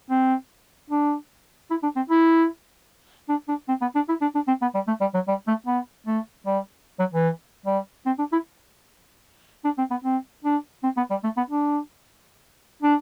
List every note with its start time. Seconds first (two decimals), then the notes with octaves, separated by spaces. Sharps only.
0.10 C4
0.90 D4
1.70 E4
1.83 D4
1.96 C4
2.09 E4
3.29 D4
3.48 D4
3.68 C4
3.81 B3
3.95 D4
4.08 E4
4.21 D4
4.35 D4
4.47 C4
4.62 B3
4.74 G3
4.87 A3
5.01 G3
5.14 F#3
5.28 G3
5.47 A3
5.66 B3
6.06 A3
6.46 G3
6.99 F#3
7.13 E3
7.65 G3
8.06 C4
8.18 D4
8.32 E4
9.64 D4
9.78 C4
9.90 B3
10.04 C4
10.44 D4
10.83 C4
10.97 B3
11.10 G3
11.23 A3
11.37 B3
11.50 D4
12.82 D4